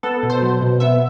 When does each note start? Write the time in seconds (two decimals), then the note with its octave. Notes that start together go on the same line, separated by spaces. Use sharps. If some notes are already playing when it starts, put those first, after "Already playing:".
0.03 B3 A4
0.23 B2
0.30 C5
0.42 F#3
0.61 B2
0.80 B3 E5